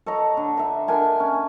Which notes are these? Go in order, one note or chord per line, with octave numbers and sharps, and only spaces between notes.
A4 C#5 D#5 A#5
D3
E5 A#5
D3 A#4 G#5 A5
C#4